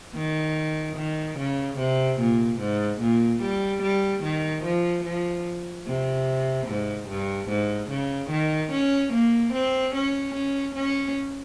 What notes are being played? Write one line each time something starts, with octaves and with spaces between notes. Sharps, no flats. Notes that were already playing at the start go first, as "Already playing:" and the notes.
D#3
D#3
C#3
C3
A#2
G#2
A#2
G3
G3
D#3
F3
F3
C3
G#2
G2
G#2
C#3
D#3
C#4
A#3
C4
C#4
C#4
C#4